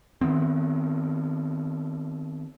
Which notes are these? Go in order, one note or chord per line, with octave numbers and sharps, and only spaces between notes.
D#3 F#3 B3 C4